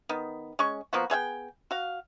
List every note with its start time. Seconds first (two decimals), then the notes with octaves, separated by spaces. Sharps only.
0.09 D#3 B3
0.59 G#3 C#4 C#6
0.93 F3 A#3 B3 F#4
1.10 B3 G#4 E5 G5
1.71 F#4 F5